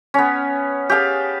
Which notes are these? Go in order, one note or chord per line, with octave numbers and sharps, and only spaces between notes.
B3 C#4
G4 G#4 F5 A5